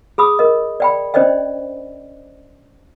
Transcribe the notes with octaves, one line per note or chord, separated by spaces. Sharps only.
G#4 B5 D#6 E6
A#4 D#5
D5 G5 B5
C#4 D4 C5 D5 D#5 G5